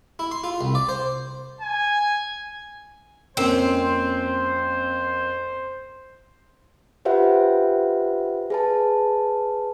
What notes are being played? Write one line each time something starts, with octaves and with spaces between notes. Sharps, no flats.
E4
C6
F4
C2
D5
C5
G#5
F2 A#3 C4 C#4 C5
F4 G4 B4 C5 E5 F#5
G#4 B4 A5